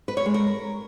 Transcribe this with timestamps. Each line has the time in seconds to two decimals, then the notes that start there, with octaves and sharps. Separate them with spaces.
0.08 B4
0.17 C#5
0.26 G#3
0.34 A#4